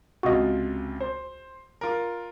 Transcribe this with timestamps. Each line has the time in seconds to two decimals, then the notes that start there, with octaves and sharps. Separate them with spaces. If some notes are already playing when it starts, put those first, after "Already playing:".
0.23 C#2 C3 F4 F#4 D#5
1.00 C5
1.81 F4 A#4